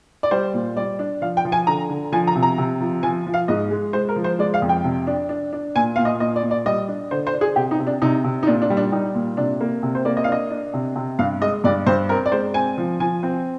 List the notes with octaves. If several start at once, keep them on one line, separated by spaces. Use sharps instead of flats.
D5
G3 C5
A#2
G3 D5
D4
F3 F5
G5
F3
G#5
D3 A#5
D3
F3 G#5
A#5
C3
A#5
C3
F3
F3 G#5
F3
F5
G#2 D#5
G#3
G#3 C5
A#4
F3
C5
G#3 D5
F5
F2
G5
C3
D4
D4
D4
A#2 G#5
A#2 F5
D#5
A#2 D#5
D5
A#2
D5
G3 D#5
D4
D3 C5
C5
D4
G#4
C3 G4
D#4
C3
D4
C3 D#4
C3
D#4
A#2 D4
D4
G3
D4
G3 D#4
A#2
C3 D4
A#3
C3
C5
A#3 D5
D#5
F5
D4 D#5
D4
C3
C3
G2 F5
G#3 D#5
G2 D5
G2 C5
C4 A#4
D5
G#3 C5
C4 G#5
F3
F3 G#5
C4